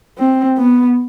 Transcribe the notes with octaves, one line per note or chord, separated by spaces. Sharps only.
C4
B3